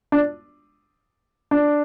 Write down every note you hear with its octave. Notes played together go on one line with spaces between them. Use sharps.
D4
D4